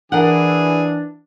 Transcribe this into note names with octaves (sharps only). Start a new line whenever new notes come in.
E3 D4 G#4 A#4 F#5